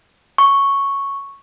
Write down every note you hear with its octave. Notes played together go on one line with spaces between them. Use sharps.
C#6